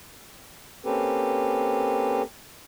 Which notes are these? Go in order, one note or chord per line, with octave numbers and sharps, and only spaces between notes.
A#3 C4 C#4 G4 A4 B4